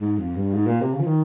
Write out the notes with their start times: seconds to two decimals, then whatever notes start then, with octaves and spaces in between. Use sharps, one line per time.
0.01 G#2
0.18 F2
0.36 G2
0.54 G#2
0.67 A#2
0.81 C3
0.94 C#3
1.00 F3
1.07 D#3